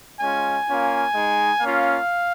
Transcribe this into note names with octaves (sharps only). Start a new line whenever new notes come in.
G#3 C#4 F4 G#5
A#3 C#4 F4
G#3 D#4
A#3 C#4 F4 F5